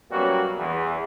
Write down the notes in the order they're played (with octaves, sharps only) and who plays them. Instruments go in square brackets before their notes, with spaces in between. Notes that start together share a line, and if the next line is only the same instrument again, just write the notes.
[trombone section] B2 F#3 G3 A#3 C#4 F#4
E2 E3